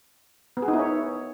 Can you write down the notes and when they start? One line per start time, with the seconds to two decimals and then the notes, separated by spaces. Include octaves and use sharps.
0.57 B3
0.62 G#4
0.68 D#4
0.74 E4
0.79 C#5